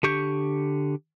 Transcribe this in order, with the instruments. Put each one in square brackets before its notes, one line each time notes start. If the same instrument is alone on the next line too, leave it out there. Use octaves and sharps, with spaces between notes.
[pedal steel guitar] D3 G4 C#6 G6